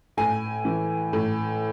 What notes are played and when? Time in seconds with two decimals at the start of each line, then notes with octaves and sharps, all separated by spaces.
0.17 A2 G#5
0.65 E3
1.13 A2